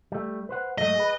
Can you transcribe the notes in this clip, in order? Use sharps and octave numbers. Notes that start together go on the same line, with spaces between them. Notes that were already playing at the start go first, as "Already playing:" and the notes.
G3 A3
B4 C5 F#5
G#2 F#3 A3 D#5
G#4 B4